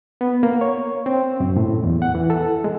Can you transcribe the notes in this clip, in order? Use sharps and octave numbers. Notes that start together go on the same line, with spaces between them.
B3
A#3
C#5
C4
F#2
A2
E2
F#5
E3
A4
G#3